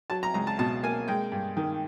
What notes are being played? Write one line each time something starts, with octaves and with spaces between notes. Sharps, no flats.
F#3 A5
A#5
C#2 A#5
A5
B2 A5
A#3 G#5
G#3 G5
G2
D#3